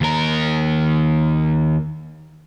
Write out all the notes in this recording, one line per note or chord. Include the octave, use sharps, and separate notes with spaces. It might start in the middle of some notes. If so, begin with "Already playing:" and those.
D#2 A#4